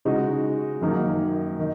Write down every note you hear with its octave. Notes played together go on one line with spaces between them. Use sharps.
C#3 G#3 D#4 F#4
F#2 D#3 F#3 A#3 D#4
D#3